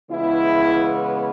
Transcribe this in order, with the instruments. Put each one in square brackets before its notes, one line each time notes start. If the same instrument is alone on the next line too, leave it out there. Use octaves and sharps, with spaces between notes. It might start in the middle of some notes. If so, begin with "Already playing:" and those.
[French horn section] C#3 E3 G#3 B3 E4